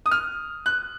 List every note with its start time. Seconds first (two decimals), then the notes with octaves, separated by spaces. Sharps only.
0.06 D#6
0.11 F6
0.66 F#6